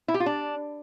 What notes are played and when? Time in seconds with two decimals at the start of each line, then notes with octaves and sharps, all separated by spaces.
0.08 E4
0.14 G4
0.20 F4
0.26 D4